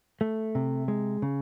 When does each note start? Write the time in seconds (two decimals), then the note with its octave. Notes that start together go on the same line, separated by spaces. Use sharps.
0.21 A3
0.55 C3
0.88 G#3
1.22 C#3